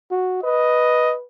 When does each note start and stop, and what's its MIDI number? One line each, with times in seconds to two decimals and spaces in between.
0.11 0.39 66
0.43 1.23 71
0.43 1.15 75